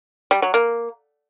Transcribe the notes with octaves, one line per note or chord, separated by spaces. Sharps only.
G3
F#3
A#3